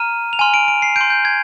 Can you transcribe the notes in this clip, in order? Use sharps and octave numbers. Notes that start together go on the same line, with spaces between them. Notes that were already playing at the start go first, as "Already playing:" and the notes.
Already playing: A#5 F6 D#7
F7
G#5 C6 F6 D#7
D7
D7
C7
C6 G6 D7
G6
G#6